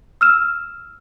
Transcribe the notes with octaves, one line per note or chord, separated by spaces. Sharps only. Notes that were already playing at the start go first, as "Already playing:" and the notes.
E6 F6 E7